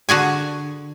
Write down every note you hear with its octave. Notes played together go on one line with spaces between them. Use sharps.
D3 F#4 G#4 G#5